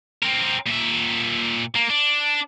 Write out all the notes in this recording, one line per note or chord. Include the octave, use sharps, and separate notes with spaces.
C4 A#4
A#2 E5
A#3
D4